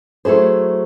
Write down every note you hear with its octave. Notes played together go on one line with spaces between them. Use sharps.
F#3 A3 E4 G#4 C5